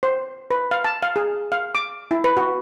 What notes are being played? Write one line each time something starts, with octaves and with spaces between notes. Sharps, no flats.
C5
B4
F5
A5
F5
G#4
F5
D6
E4
B4
F#4